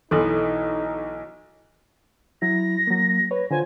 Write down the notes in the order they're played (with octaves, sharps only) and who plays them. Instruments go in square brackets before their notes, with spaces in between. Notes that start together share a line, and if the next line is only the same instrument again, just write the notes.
[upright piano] B1 E3 [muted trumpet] D#4 [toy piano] A4 C6
[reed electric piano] F#3 E4 [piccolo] A#6
[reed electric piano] F#3 A#3
B4 C#5
[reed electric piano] D3 F4 C5 [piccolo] G#5